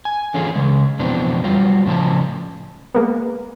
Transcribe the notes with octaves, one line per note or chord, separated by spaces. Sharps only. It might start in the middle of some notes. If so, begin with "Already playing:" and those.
G#5
D3 E3 C#4 F4 G#4
C#3 G#3
F2 B2 E3 C4 D4
F#3 G3 F4
A2 C#3 F3 A5
G#3 A#3 B3